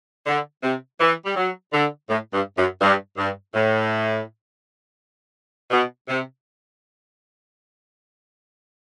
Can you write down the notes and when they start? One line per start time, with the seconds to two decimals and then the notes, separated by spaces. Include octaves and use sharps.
0.27 D3
0.63 C3
1.00 E3
1.25 G3
1.36 F#3
1.73 D3
2.08 A2
2.33 G2
2.57 F#2
2.81 G2
3.17 G2
3.53 A2
5.71 B2
6.08 C3